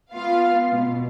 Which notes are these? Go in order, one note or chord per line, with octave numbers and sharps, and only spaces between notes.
B3 F4 F5
B2